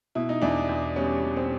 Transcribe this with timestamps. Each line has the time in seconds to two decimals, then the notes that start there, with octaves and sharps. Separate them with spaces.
0.15 B2 E4
0.29 D#4
0.41 E2 D4 E4
0.69 E2
0.96 G3 B3 C#4
1.23 B2
1.37 C4